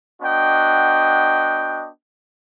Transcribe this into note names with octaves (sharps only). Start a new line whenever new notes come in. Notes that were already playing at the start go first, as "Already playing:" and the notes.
B3 D4 F#4 D#5 G5